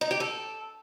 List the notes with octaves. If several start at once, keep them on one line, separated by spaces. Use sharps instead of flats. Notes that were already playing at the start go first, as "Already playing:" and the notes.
D#4
G4
A4